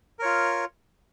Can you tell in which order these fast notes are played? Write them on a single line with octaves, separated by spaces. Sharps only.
A#4 C#5 F4